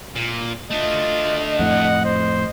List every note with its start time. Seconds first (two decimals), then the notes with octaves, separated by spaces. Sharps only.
0.16 A#2
0.71 A3 D4 F4 D#5
1.59 F2 A2 F#5
2.05 C5